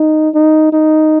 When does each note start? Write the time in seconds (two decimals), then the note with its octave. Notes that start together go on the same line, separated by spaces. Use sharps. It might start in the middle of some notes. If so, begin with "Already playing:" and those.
Already playing: D#4
0.34 D#4
0.73 D#4